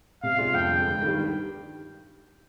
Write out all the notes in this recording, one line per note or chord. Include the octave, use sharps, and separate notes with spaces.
C3 F5
G3 D4 F4 G#4
F2 G5
D3 G#3
G2
D#3 G3